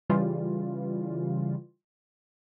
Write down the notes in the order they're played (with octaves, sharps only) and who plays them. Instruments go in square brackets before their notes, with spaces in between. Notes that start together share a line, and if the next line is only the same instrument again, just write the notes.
[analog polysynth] C#3 E3 G3 F4